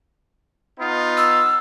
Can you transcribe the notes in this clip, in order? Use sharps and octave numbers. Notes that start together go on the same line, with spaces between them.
B3 D#4 F4
E6